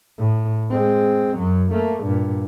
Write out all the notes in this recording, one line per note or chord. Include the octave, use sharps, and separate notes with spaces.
A2
G#3 C4
F#2 F#3
A3 A#3
G2 A#2